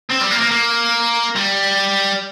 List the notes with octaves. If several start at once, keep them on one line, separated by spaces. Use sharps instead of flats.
C4
G3
A#3
A#3
A#3
G3